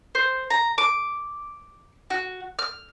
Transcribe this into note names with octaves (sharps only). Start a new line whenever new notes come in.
C5
A#5
D6
F#4
F6